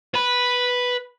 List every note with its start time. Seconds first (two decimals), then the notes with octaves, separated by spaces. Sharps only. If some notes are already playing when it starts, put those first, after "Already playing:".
0.14 B4 B5